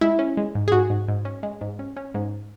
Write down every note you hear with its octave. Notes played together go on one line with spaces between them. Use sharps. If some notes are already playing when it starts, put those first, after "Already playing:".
G#3 E4
C#4
G#3
G#2
G#4
G#2 F#4
G#2
G#2
C#4
G#3
G#2
C#4
C#4
G#2